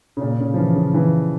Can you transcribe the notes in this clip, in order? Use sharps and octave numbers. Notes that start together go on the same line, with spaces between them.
C#3
A#2
C#3
F3
E3
C#3
E3